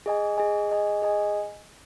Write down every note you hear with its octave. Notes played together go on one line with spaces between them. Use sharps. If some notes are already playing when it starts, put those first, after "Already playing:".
G#4 D#5 G#5
G#4 D#5 G#5
G#4 D#5 G#5
G#4 D#5 G#5